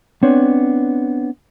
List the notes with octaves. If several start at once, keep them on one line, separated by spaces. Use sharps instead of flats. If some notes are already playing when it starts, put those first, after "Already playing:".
B3 C4 D4 C#5